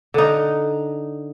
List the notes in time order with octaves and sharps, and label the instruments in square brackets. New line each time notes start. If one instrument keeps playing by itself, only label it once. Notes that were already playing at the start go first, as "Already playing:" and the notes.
[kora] D3 D#4